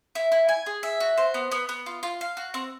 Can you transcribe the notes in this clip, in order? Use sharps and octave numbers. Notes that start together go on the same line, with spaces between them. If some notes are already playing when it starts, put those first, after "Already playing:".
E4
E4
G#5
G#4
E5
F#4
C5
B3
B3
B3
F4
F4
F5
F#4
C4